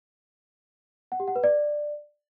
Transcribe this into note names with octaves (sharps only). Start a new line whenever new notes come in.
F#5
G4
F#5
B4
D5